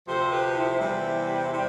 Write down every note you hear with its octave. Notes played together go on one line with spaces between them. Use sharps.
D2 C3 F3 A4 C5
G4 B4
E4 G4
E2 C3 G3
C3 G3